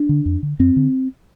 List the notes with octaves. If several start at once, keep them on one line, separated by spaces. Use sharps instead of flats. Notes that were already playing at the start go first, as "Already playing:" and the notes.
Already playing: D4
D3
F2
D3
F2 C4
D3